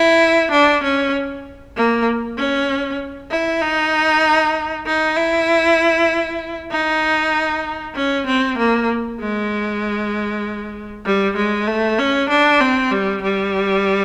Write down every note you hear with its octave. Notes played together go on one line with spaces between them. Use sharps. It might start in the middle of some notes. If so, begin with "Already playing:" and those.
Already playing: E4
D4
C#4
A#3
C#4
E4
D#4
D#4
E4
D#4
C#4
C4
A#3
G#3
G3
G#3
A3
C#4
D4
C4
G3
G3